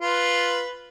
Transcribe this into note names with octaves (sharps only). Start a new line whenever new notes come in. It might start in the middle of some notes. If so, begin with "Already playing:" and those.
F4 B4